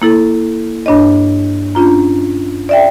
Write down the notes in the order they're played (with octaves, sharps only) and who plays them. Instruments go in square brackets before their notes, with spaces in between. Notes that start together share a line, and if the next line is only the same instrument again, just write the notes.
[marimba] A#3 E4 A4
G2 D4 C#5 D#5
C#4 D4 F4 A#5
D5 E5 G5